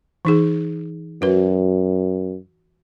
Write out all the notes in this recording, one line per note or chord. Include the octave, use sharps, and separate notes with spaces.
E3 D#4 G#4
F#2 F#4 B4